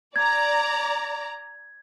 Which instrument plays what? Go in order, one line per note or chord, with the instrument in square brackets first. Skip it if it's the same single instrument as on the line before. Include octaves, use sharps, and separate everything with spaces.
[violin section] D5 A#5 [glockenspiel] G#6